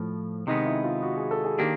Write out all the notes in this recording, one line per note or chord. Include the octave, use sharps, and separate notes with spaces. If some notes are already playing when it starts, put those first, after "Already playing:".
Already playing: A2 F3
C3 D#3 G#3 B3 D#4
E4
F4
F#4
G#4
A4
G#4
D#3 A#3 D4 G4